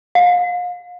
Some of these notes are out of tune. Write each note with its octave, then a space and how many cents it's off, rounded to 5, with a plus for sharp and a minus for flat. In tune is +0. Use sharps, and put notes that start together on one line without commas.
F5 +35